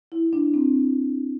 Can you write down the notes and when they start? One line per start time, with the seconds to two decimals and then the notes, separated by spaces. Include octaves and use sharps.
0.12 E4
0.33 D4
0.54 C4